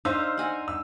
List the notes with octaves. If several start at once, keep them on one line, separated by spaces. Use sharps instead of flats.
D4 D#4 C5 F5 E6
F#5 G#5 A#5
E6